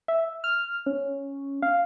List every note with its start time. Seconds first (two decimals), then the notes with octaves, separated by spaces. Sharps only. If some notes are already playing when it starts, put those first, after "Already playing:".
0.08 E5
0.44 F6
0.86 C#4
1.62 F5